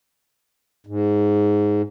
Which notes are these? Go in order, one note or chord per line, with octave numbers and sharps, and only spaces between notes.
G#2